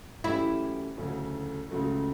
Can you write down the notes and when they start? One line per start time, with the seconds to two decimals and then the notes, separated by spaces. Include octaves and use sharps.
0.24 F#2 E3 A3 C#4 E4 G4
0.98 D2 C#3 F#3 A3 C#4
1.70 C#2 C#3 F#3 A3